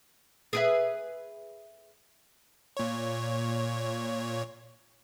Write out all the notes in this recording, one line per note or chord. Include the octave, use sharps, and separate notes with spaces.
G#4 B4 E5
A#2 C#5